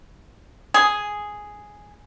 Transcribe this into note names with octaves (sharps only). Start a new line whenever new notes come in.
G#4